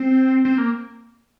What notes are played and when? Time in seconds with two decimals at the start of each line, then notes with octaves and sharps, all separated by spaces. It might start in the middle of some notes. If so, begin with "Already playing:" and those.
Already playing: C4
0.45 C4
0.58 A#3